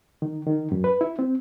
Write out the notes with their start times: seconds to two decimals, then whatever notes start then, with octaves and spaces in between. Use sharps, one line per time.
0.22 D#3
0.47 D#3
0.72 F#2
0.84 B4
1.01 E4
1.19 C4